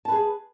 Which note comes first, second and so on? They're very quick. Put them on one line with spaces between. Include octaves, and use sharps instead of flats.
A5 B4 G#4